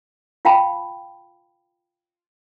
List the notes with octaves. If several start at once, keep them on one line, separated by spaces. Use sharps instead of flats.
F4 F5 G5 A5 B5